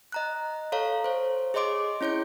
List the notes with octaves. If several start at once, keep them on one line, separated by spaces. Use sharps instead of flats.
D#5 A#5 F#6
A4 C#5 F5 A#5
C5 C#5
G#4 C#5 D#5 C6 D6 D7
C#4 E4 C#5 G6 D7